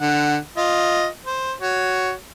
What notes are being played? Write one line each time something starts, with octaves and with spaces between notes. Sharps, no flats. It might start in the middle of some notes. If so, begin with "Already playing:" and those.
D3 F#5
F4 D#5
C5
F#4 C#5